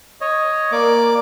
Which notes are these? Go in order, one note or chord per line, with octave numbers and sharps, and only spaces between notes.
C#5 D#5
A#3 D5 D6